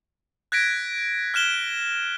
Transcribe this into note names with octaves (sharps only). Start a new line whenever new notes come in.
F#6 G#6 A#6 B6 D7
F6 F#6 E7 G7